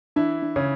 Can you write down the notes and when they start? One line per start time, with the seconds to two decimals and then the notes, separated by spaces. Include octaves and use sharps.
0.16 E3 D4 E4
0.42 D4
0.56 C#3 C#4